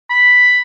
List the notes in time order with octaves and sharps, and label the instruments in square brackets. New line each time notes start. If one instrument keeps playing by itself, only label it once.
[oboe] B5